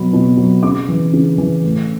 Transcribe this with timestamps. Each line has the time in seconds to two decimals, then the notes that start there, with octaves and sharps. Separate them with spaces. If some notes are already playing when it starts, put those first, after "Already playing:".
Already playing: B2 F#3 B5
0.13 B2
0.37 F#3
0.63 C#3 D6
0.88 E3
1.13 C#3
1.38 E3
1.64 A2